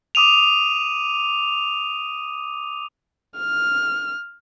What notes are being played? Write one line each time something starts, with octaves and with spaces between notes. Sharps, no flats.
D6 D#6 D#7 F7
F6